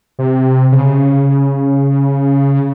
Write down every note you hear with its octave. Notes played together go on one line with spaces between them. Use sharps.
C3
C#3